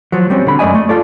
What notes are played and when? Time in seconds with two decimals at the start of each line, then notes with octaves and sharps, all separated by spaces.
0.12 F3 F#3
0.30 G3 C4 C#4
0.45 B1 D3 B5
0.59 F#2 A3 D5 D#5 G#5
0.75 A3
0.89 F4 A4 D5